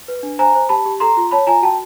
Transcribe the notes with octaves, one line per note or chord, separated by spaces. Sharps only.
B4
D4
C5 G#5 A#5
C5
G4 A5 B5
G4
A4 A#5 C6
F4
C#5 A5 B5
F4 G#5 A#5
F#4 G5 A5